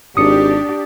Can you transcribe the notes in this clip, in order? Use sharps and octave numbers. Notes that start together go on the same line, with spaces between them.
G#1 D4 G4 D#6 C#7